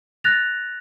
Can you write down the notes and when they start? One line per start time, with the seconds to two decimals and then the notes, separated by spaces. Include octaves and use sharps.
0.24 F#6 A6 A#6 F7